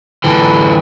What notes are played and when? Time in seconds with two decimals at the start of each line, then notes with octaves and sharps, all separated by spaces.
0.24 D3 E3